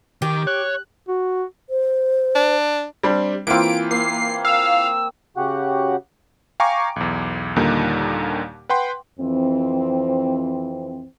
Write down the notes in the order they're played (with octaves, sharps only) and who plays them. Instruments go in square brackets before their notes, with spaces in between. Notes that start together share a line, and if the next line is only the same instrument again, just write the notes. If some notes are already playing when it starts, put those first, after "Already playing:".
[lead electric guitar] D#3 [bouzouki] G4
[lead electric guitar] C#5 [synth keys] F#6
[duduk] F#4
[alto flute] C5
[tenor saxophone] D4
[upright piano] G3 C4 D4
[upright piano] E3 F4 [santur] A#3 C4 [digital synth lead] D7
[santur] A#3 [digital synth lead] C7
[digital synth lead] F5 [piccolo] E6
[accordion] C#3 F#4 G4 F#5
[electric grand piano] F5 G5 G#5 A#5 C#6 D6
B1 E2
D#2 A#2 D3 G3 A#3 D#4
B4 F#5 G5 C6
[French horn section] F2 E3 C4